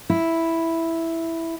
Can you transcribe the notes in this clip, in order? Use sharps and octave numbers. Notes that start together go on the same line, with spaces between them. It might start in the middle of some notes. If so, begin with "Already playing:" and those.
E4